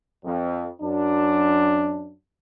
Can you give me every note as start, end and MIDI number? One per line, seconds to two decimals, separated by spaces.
0.24 0.67 41
0.81 2.13 42
0.81 2.13 62